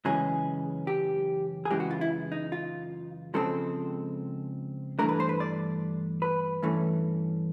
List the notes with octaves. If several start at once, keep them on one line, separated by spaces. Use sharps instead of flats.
F#2 C#3 E3 G#3 C#4 G#4
G4
G#4
F#2 C#3 E3 G#3 G4
F#4
F4
E4
D#4
F4
C#2 C#3 F3 G#3 C4 A4
G2 E3 A3 D4 A#4
B4
C5
B4
D5
B4
G2 E3 A3 C#4